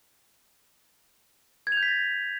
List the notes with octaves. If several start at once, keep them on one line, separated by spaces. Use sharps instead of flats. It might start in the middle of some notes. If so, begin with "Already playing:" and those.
G#6
F7
G6
B6
A6